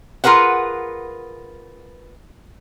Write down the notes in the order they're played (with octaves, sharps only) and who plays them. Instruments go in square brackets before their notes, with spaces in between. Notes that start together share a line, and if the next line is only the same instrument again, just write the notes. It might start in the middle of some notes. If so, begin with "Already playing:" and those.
[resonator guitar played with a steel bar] F4 G#4 A#4 B4 F#5